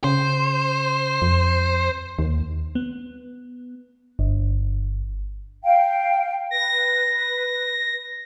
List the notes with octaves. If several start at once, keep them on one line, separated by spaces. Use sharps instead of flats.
C#3 C5
F2
D#2
B3
G1
F5 G5
B4 A#6